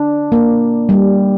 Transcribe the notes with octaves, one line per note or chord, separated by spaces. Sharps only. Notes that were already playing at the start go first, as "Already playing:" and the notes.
Already playing: D4
A#3
G3